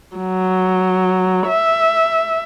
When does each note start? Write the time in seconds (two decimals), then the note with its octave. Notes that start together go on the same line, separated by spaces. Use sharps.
0.17 F#3
1.48 E5